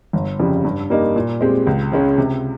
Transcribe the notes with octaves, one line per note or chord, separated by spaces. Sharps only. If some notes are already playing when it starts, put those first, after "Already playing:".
G1
F2 C#3 G3
G2
G3 A#3 D#4
A#2
G#3 C4 G4
C#2
C#3 G#3 C#4
C3